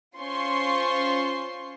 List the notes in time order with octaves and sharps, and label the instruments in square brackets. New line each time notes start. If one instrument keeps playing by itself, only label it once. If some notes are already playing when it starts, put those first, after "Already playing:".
[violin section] C#4 F4 C5 C6 C#6 C7